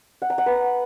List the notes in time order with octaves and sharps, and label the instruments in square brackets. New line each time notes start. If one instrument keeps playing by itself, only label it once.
[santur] F#5
A#5
F#5
B4